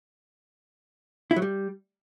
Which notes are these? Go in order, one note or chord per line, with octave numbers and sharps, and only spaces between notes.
E4
F#3
G3